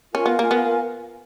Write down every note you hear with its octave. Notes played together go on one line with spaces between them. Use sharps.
C#4 F4 A#4 F5 G#5
B3
A#3
B3